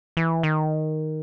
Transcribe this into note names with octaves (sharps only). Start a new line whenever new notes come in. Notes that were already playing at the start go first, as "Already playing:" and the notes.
E3
D#3